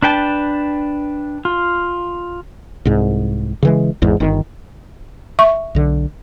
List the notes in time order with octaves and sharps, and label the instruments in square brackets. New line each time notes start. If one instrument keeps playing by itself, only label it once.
[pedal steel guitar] D4 B4 G5 A5
F4
[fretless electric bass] C2 G#2
C#3 E3 G#3
G#1 E2 G#2
G1 D#3
[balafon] E5 C#6
[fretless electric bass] B1 D3